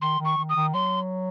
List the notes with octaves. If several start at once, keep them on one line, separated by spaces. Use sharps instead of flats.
D#3 C6
D#3
C#6
D#3
D#6
D#3
F#3 C6